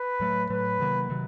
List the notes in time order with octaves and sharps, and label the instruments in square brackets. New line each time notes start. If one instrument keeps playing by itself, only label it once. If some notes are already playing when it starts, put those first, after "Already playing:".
Already playing: [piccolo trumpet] B4
[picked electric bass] A2 F#3 A3
[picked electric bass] A2 F#3 A3 [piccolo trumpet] B4
[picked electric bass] C3 D#3 F#3 A#3
C3 D#3 F#3